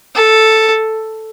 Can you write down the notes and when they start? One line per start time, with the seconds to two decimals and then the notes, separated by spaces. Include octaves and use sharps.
0.15 A4